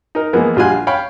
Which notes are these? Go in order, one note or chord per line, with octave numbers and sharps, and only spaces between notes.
D#4 A#4
E3 F3 G#3 A#3 B3
A#1 G3 F4 F#4 G#5 F#6
C#5 F5 G5 B5